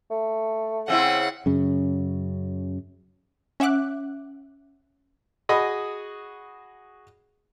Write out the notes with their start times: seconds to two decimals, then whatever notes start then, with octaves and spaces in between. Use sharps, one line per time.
0.10 A3
0.88 C#3 C4 E4 F#5
1.46 F#2 C#3
3.60 C#4 E5 F#5 D6 F#6
5.49 F#4 G#4 D#5 B5